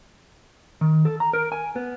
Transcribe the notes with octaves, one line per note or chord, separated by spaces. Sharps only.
D#3
A4
A#5
A#4
G#5
B3